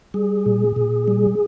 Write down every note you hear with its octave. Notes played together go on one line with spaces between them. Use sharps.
G3 G#4
A#2
A#2
G3